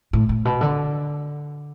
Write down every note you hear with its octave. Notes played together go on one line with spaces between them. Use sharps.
A2
A2
B2
D3